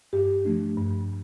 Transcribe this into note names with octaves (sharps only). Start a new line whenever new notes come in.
G2 G4
F3 A3 D4
G2